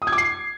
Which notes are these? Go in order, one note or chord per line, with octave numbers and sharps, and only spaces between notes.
D#6
G#6
D6
C7